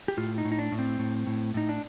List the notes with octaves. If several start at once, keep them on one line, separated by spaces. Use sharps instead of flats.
G4
A2 F4
D#4
A2
D#4
D4
A2
C4
A2
A2
A2 D#4
D4